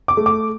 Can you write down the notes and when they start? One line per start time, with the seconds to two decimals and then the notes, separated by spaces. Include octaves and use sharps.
0.08 D6
0.17 A3
0.26 D6